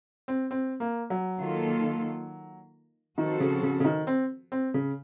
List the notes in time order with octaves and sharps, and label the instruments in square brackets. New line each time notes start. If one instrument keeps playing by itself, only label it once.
[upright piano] C4
C4
A#3
F#3
[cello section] D#3 A#3 F4 A4
[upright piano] D#3 [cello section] F3 C4 F#4 A4
[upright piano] C#3
C#3
C#3
D#3
C4
C4
C#3